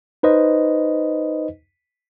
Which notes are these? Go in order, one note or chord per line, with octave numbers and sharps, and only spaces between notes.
D#4 B4 C5 D#5